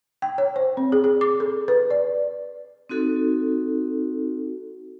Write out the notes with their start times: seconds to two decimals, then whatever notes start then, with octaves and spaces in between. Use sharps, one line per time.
0.22 G5
0.38 C#5
0.56 C5
0.77 C4
0.92 G#4
1.04 G#4
1.21 D6
1.40 A4
1.68 B4
1.90 D5
2.89 C4 D#4 F#4 A4